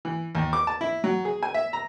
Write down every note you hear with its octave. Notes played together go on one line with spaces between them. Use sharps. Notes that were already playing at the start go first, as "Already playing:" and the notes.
E3
D#2
D6
A5
E4
F#3
G#4
G#5
E5
A#5